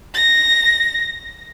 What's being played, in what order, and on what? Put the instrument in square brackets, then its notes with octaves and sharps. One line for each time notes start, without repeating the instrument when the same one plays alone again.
[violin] A#6